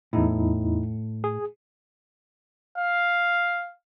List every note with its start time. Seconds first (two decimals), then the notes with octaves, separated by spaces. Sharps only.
0.13 E2 A2 D#4 E4
1.24 G#4
2.78 F5